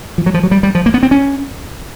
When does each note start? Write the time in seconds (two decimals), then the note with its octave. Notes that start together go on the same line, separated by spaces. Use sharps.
0.18 F3
0.26 F#3
0.34 F3
0.43 F#3
0.51 G3
0.63 G3
0.75 F3
0.86 A#3
0.94 B3
1.03 C4
1.11 C#4